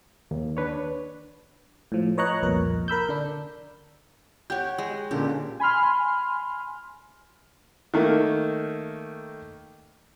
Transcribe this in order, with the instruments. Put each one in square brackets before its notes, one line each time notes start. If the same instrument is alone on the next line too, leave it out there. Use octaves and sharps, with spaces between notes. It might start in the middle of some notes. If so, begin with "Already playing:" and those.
[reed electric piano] D#2
D4 B4 C#5
[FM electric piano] A2 F3
B4 C#5 D#5 A#5 C#6 F#6
C2 F2 A#2 A#4
A#4 B5 E6 G6
D3 D4
[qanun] G4 C#5 [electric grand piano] F#5 G5 G6
[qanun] G#3
[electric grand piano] A#2 D3 C#4 [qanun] G4
[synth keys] G#5 B5 C6 F6
[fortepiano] D#3 A3 A#3